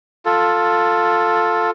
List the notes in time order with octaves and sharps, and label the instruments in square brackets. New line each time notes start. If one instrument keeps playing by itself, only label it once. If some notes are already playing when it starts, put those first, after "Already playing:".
[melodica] F4 A4